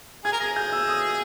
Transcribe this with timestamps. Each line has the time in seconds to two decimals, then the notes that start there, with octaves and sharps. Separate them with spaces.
0.25 G#4 G#6
0.33 A#4
0.40 G#4 A#6
0.56 G6
0.72 E6
0.88 D#6